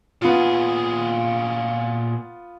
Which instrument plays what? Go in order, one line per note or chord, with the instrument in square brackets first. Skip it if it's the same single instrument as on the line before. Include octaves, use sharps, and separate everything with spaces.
[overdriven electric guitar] A#2 G#4 [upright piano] B3 F4